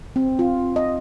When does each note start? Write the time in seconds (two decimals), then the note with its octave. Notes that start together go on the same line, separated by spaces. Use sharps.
0.16 C4
0.39 F4
0.76 D#5